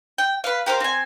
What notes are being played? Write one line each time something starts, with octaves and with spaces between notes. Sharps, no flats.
G5
B4 F5
G4 A#4 C5 F5
C4 G#5